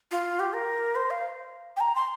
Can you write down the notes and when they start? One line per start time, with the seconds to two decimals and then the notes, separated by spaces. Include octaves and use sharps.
0.11 F4
0.40 G4
0.53 A#4
0.95 C5
1.10 F5
1.77 G5
1.80 A#5
1.96 C6